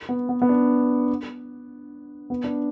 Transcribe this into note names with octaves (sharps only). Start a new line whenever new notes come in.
B3
B3
B3
D4
B3
D4